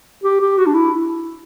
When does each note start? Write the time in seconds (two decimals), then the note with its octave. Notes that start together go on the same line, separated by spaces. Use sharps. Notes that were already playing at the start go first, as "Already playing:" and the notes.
0.24 G4
0.41 G4
0.58 F#4
0.67 D4
0.74 E4